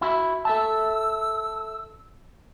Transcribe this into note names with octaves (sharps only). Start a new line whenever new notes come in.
E4 F#4 E5
A4 E5 A5 E6